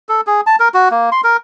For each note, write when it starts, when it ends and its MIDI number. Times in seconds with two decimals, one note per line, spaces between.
0.09 0.21 69
0.27 0.41 68
0.47 0.56 81
0.60 0.68 70
0.74 0.89 66
0.91 1.10 58
1.12 1.21 84
1.24 1.37 70